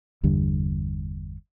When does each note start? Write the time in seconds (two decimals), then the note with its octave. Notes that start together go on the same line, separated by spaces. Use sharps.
0.23 G1 E2 D3 G3